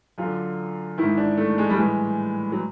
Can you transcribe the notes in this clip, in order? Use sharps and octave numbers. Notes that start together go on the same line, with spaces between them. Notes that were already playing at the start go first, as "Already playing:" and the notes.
F#2 D3 F4
G#2 D#3 E4
D4
A3
G#3
G3
A2 E3 G#3
F#3